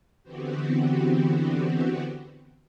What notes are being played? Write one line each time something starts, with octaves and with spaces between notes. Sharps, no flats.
D3 E3 B3 C4 F#4 G4